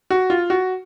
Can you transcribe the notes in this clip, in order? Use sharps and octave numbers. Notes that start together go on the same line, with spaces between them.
F#4
F4
F#4